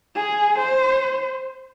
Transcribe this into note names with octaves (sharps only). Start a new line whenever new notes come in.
G#4
C5